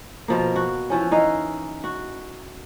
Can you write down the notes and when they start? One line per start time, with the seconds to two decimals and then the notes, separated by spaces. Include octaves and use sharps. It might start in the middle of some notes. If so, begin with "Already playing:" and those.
0.28 B2 F3 A#3
0.56 F#4
0.90 E3 F3 C#4
1.11 E3 D#4 D#5 F5
1.84 F#4